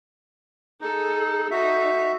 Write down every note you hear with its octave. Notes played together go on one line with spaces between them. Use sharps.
D#4 G#4 A4
D#4 F#4 A4 E5